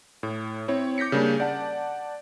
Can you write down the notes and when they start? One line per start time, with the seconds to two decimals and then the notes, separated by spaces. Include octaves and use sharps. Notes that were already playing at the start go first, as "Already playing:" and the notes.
0.23 A2
0.68 C4 E4 C#5
0.98 D6 G6 A#6 B6 C#7
1.12 C#3 G3 A#3 D4
1.40 D5 F#5 A5